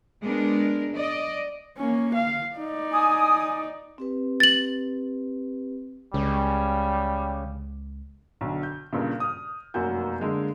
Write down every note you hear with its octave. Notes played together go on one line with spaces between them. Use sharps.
G#3 B3 D4 A#4
D5 D#5
A#3 C#4
F5
D#4 D5
G#5 D#6
C4 G4 B4
A6 F#7
C#2 C#3 G3
B1 D3
G6
G2 A#2 C#3
D#6 F6
F1 F#2 A#3 F#4 G#5 G6
D3 G#3 A#3